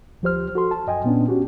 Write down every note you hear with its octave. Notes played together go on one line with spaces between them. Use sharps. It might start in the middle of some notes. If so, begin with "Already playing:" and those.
D2 F3 G4 C5 F6
F#4 A4 C6
A5
F#2 D#5 G5 G#5
A#2 B3 C#4 D4
C#4 F#4 G4